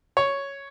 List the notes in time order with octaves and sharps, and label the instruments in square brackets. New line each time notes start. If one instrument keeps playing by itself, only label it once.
[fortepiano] C#5